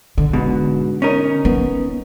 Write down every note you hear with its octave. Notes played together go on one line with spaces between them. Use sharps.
D3
G#2 B2
C#4 D#4 A#4
B3